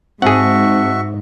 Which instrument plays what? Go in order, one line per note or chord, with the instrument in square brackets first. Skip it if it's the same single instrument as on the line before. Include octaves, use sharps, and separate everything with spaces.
[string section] G#2 [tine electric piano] C4 A5 [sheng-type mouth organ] F#4 E5 C#6 [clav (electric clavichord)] G#4 F#5